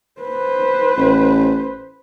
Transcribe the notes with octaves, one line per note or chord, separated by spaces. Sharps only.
B4 C5
A1